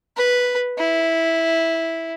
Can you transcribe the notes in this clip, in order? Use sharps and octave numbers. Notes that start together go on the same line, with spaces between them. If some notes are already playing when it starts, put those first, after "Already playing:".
B4
E4